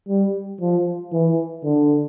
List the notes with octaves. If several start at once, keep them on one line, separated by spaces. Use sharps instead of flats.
G3
F3
E3
D3